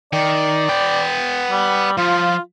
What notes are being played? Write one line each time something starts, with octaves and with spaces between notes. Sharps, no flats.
D#3 D5
B3 G5
G3
F3 F4